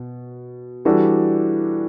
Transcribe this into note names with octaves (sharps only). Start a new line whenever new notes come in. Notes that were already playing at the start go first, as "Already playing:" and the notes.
Already playing: B2
E3 G3 D4 F#4 A4